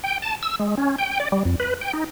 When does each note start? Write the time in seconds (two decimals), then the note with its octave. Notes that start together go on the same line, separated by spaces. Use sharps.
0.04 G5
0.22 A5
0.43 E6
0.59 G#3
0.77 C#4
0.98 G5
1.20 D5
1.32 G3
1.45 F2
1.60 B4
1.81 G5
1.93 D#4